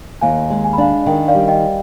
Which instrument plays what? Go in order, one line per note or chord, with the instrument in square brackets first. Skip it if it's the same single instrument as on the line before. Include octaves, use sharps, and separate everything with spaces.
[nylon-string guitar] D#2 [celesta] F5 G#5
[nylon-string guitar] G#3
[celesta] G#5
B5
[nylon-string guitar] D4 [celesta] F5 G#5
[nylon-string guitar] D#3 [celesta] D#5 G5
[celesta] D5 F5
[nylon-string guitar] G3
[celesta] D#5 G5